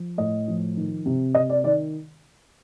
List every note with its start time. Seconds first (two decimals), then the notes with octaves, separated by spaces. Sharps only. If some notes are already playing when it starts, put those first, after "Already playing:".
Already playing: F3
0.18 A2 D#5
0.48 F3
0.77 D#3
1.06 C3
1.35 C3 D#5
1.50 D5
1.64 D#3 D5